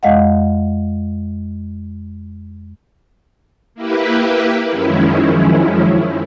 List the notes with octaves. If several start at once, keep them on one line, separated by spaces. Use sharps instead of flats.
F2 G#3 D#5 F5 F#5
A#3 E4 G4 B4
F#2 D#3 F3 G#3 C#4 E4